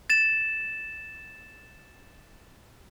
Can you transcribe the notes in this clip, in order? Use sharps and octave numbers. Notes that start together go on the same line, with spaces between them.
A6 E7